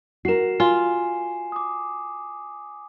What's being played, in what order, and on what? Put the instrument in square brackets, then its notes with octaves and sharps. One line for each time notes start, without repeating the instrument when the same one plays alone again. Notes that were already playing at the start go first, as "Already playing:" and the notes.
[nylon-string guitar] F#4 A#4 [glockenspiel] C7 E7
[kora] F4 [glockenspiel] G#5
[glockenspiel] D6 D#6